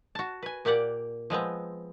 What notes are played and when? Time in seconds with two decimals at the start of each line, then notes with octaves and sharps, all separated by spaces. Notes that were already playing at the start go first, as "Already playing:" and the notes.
0.15 F#4 A5
0.43 B4 G#5
0.65 A#2 A#3 G4 D5 F#5
1.30 F3 G#3 B3 C4